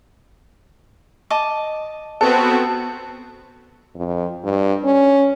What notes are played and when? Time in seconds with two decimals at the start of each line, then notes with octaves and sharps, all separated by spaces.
1.30 D#5 A5 D6
2.21 B3 C4 F#4 A4
3.96 F2
4.44 G2
4.84 C#4